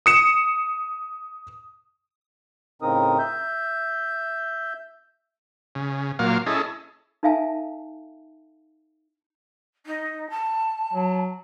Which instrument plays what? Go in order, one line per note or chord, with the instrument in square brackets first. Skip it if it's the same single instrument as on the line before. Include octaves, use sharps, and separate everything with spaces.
[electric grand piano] D#6 C#7 E7
[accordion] A2 C#3 C4 D#4 A#4 D#6
E5 G6
[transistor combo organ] C#3
A#2 F#3 A#3 F4 F5
C#4 E4 G#4 A4 D#5
[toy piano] D#4 A4 E5 F5 G#5 A5
[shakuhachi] D#4
A5
[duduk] F#3